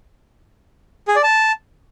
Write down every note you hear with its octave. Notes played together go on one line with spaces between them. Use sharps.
G#4
D5
A5